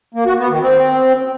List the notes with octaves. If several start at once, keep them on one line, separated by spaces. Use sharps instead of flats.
A#3
F#4
B3
D#3
C4